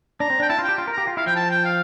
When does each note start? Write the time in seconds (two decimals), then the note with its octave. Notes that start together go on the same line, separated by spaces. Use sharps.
0.20 D4 A#5
0.30 C4
0.40 D4 G5
0.49 E4 A5
0.59 F4
0.64 G4 G5
0.78 F4
0.88 A#4
0.93 G4 A#5
1.08 F4
1.17 E4 F5
1.27 F3 G5
1.36 A5
1.51 G5
1.65 F5